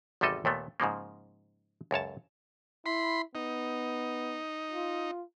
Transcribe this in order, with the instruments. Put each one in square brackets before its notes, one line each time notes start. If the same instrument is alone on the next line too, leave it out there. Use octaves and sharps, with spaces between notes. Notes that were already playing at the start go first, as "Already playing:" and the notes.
[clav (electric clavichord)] G#1 E2 C3 G3 A4 D#5
D#2 A#2 A3 B3
G#2 C#3 F3 A#3
C#2 F#2 C#5 A5
[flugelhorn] E4 [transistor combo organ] B5 C6
[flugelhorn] B3 [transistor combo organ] D#4
[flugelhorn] F4